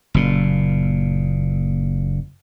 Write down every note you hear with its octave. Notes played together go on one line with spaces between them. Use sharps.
F#1 A#2